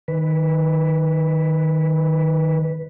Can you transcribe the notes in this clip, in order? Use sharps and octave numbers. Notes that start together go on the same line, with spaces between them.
D#3 B4